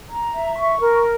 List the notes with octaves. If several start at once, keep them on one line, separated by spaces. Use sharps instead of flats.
A#5
E5
C#6
A#4